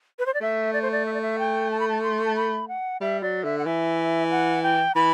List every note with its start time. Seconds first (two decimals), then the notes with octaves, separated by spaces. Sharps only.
0.19 B4
0.26 C5
0.34 D5
0.41 A3 E5
0.73 D5
0.82 C5
0.92 D5
1.06 E5
1.14 D5
1.21 E5
1.39 G5
1.71 A5
1.80 B5
1.88 A5
2.03 C6
2.25 A5
2.36 B5
2.68 F#5
3.00 G3 E5
3.22 F#3 D5
3.44 D3 E5
3.58 F#5
3.65 E3 E5
4.31 F#5
4.63 G5
4.95 E3 B5